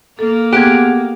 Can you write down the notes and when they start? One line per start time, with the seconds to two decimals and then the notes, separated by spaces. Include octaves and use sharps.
0.19 A#3 A4
0.53 B3 G4 G#4 G5 F#6 G#6